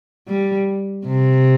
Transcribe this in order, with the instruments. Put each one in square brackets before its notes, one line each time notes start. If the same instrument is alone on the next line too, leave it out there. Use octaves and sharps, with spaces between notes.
[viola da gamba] G3
C3